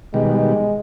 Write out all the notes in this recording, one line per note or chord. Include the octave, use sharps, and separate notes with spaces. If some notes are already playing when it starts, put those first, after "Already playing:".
B2 D#3 G3 G#3